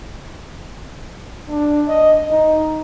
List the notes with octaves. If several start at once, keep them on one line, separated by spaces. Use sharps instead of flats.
D4
D#5
D#4